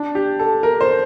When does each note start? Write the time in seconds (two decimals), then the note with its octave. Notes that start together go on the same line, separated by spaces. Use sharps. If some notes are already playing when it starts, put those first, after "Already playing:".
Already playing: D4
0.15 G4
0.39 A4
0.63 A#4
0.81 C5